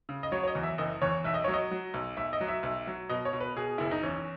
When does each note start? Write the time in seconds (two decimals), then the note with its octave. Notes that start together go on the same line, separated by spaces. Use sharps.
0.09 C#3
0.23 D#5
0.32 F#3 C#5
0.43 C#5
0.48 D#5
0.55 E2
0.63 E5
0.78 F#1 D#5
1.02 E2 C#5
1.24 B1 E5
1.34 D#5
1.44 F#3 C#5
1.54 D#5
1.71 F#3
1.94 B1
2.17 B1 E5
2.33 D#5
2.41 F#3
2.48 E5
2.63 B1
2.87 F#3
3.09 B2 D#5
3.25 C#5
3.33 B2
3.40 B4
3.56 B2 G#4
3.78 F#1 E4
3.91 D#4
4.03 E2 C#4